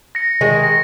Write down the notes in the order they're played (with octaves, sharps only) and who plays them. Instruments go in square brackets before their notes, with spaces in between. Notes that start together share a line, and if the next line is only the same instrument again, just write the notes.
[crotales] A#6 C#7
[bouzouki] D#3 G#3
[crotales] A#6